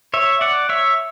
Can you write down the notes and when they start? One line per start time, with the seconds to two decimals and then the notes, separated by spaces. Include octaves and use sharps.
0.14 C#5 E5
0.41 D5 F#5
0.69 C#5 E5